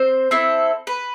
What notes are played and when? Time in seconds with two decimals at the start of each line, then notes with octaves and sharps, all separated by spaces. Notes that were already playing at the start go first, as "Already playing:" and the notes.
Already playing: C4 C5
0.31 C4 E4 A4
0.87 B4